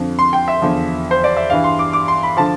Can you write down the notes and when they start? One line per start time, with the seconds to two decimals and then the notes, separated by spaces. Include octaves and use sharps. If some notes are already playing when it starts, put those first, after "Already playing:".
Already playing: F2 D3 F3
0.19 C6
0.33 G5
0.48 E5
0.62 E2 D3 F3
1.11 C5
1.24 D5
1.37 E5
1.50 G2 E3 F5
1.64 C6
1.79 D6
1.93 D6
2.08 C6
2.23 B5
2.37 D3 F3 A5